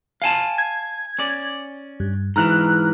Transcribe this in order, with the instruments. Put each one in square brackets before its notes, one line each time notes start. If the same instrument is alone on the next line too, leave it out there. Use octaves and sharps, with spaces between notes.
[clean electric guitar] F5 G#5 A5
[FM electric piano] G#6
[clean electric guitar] C#4 D5
[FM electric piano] G2
[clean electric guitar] G#2 E3 [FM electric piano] A#5 F6 F#6